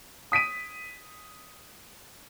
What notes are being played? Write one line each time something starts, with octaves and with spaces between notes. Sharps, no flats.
D#6 B6 D7 D#7